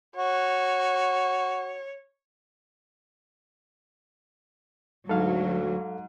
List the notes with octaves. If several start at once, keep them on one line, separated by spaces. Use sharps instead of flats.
F#4 C#5
D2 G#2 F#3 A4 F5